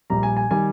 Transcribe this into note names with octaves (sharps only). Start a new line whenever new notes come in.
A#1 A#2 G3 A#5
G#5
G#5
D#3 G3 G#5